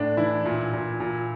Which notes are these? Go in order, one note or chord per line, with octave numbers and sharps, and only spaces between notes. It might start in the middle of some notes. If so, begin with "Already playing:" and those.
Already playing: A2 D4
E3 E4
A#2
A#2
A#2